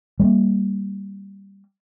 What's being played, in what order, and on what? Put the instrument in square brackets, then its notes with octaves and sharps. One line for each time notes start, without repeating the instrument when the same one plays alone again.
[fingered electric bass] G3 G#3 A#3